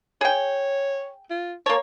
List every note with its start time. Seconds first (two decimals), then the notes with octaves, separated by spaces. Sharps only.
0.21 G#4 C#5 G5
1.31 F4
1.66 A#3 C#5 A5